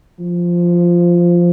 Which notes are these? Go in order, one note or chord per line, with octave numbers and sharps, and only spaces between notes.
F3